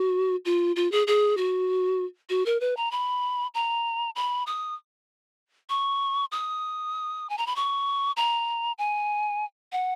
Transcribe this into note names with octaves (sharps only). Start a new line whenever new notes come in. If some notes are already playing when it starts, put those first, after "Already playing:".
Already playing: F#4
F4
F4
G#4
G#4
F#4
F#4
A#4
B4
A#5
B5
A#5
B5
D#6
C#6
D#6
G#5
A#5
B5
C#6
A#5
G#5
F#5